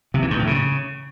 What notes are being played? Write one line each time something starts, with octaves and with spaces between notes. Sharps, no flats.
C3
E3
G2
A2
C#3